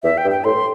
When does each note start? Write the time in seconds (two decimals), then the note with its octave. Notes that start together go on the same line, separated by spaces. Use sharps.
0.03 E2 E5
0.18 G5
0.25 G2
0.31 G5
0.44 A2 C6